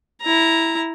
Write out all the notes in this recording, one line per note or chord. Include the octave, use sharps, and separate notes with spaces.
E4 A#5